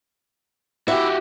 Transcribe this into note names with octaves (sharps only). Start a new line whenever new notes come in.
E4 F#4 G4